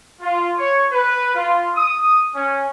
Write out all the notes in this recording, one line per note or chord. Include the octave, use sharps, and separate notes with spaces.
F4
C#5
B4
F4
D#6
C#4